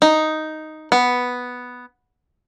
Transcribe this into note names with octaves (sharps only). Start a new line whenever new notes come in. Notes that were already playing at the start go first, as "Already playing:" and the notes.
D#4
B3